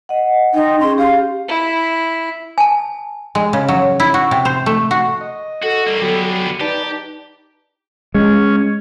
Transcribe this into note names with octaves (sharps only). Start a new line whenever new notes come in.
D#5 F#5
D#4 G5 C6
C#4 G#4 C6
G4 F5
E4
G#5 A5
G#3
C#3
F#3
E4
F#4
C3
C5
A3
F#4
D#5
F#4 A4
G3 A#3
D3 F#3 B3 G4
D#4 G4 B4 D5 A5
G#3 C#4